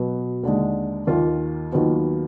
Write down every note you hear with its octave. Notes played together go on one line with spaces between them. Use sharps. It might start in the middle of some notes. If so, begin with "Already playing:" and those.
Already playing: B2 F#3 B3
D#2 D3 G#3
D#2 D#3 A#3 F4
D#2 D#3 F#3 B3 F4